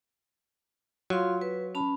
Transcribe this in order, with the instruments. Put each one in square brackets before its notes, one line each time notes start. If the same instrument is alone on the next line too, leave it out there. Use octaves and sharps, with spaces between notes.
[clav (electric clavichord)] F#3 [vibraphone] F4 F5 C6
[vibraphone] B4
C#4 A5 B5